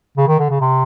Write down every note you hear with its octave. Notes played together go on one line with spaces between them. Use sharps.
C#3
D#3
D3
C#3
C3